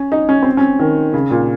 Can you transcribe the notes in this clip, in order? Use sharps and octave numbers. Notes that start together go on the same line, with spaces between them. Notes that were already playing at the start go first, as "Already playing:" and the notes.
Already playing: C#4
D#4
C#4
C4
C#4
D#3
C#3
A#2